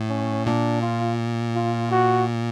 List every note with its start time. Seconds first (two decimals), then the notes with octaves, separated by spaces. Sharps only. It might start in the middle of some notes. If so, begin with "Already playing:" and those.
Already playing: A2
0.09 C#4
0.46 A#2 D4
0.82 F4
1.55 F4
1.91 F#4